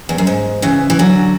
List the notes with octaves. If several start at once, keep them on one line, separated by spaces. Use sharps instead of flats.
E2
F#2
G#2
C#3 E3
E3
D3 F#3